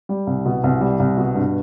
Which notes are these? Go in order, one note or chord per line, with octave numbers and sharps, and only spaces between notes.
G3
C2
B2
C2
G3
C2
B2
G2